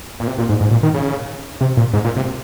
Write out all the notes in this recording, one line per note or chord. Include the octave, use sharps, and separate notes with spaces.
A#2
C3
A#2
G#2
G#2
A#2
D#3
C#3
C3
A#2
G#2
A#2
C3